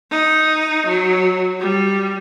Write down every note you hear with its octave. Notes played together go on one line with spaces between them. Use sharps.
D#4
F#3
G3